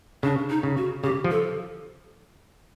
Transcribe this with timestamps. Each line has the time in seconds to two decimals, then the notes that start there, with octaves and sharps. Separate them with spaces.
0.23 C#3 D4
0.50 D#4
0.63 C#3
0.77 F#4
1.04 C#3 G4
1.24 F3
1.31 A4